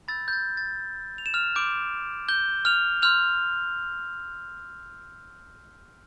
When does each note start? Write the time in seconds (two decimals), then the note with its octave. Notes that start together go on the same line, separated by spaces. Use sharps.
0.08 B5 E6 G6 A6
0.28 G6
0.33 A6
0.57 A6
1.18 F7
1.26 E7
1.34 F6 F7
1.55 C6 D6 E6 G6 D7
2.28 G6 G7
2.65 F6 F7
3.02 C6 E6 F6 G6 F7